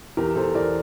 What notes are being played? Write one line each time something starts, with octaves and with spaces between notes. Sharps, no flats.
E2 G4 A#4
E2 A4 C5
E2 A#4 D5